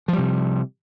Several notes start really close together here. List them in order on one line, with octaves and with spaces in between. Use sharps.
F3 G3 C3